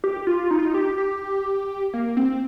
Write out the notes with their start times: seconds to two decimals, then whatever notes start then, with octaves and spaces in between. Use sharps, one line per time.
0.04 G4
0.27 F4
0.51 D#4
0.59 F4
0.65 D#4
0.74 G4
0.98 G4
1.94 A#3
2.17 C4